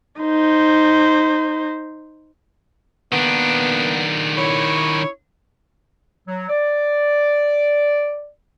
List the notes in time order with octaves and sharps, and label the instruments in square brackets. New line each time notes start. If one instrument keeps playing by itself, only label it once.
[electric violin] D#4 C5
[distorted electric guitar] D#3 D4 [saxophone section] A#3 B3
[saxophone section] E4 C#5
[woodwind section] F#3
D5